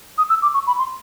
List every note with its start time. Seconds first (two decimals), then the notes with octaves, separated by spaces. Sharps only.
0.18 D#6
0.30 E6
0.42 D6
0.54 C#6
0.67 B5
0.78 C6